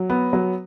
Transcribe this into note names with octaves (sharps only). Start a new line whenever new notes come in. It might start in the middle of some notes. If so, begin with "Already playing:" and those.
Already playing: F#3
B3
F#3